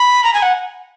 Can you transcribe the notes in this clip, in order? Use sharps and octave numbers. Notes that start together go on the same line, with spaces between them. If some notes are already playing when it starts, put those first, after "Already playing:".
Already playing: B5
A#5
G#5
F#5